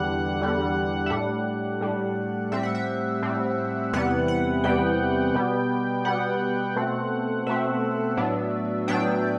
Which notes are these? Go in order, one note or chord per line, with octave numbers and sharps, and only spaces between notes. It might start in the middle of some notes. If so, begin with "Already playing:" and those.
Already playing: E2 D3 G3 F#5
E2 D3 G3
E5
A2 G3 D4 F#5
A2 G3 D4
A2 G3 C4 E5
F#5
E5
A2 G3 C4
E2 C3 E3 G3 B3 F#5
F#5
E2 C3 E3 G3 B3 G5
B2 G3 B3
B2 G3 B3 F#5
B2 A3 C4
B2 A3 C4 E5
A2 F#3 B3 D4
A2 F#3 B3 D4 G5